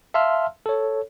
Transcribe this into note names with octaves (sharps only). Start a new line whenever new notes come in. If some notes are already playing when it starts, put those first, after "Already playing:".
E5 F5 A5 C6 E6 F6
A4 C#5